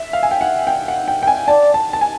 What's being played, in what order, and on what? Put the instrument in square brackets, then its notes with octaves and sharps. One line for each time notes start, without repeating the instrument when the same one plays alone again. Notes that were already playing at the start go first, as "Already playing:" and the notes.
Already playing: [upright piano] E5
F5
G#5
G5
F#5
G5
F#5
G5
G5
G#5
[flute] D5 [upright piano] A5
[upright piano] A5
A5
G#5